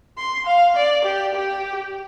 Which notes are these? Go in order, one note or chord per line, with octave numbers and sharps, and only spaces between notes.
C6
F5
D5
G4
G4